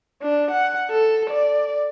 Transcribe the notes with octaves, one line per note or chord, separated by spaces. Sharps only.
D4
F#5
A4
D5